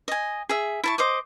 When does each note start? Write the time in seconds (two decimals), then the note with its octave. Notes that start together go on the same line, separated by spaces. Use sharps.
0.08 D#5 G#5
0.49 G#4 E5
0.83 E4 A5 C#6
0.98 C5 D#5 D6 D#6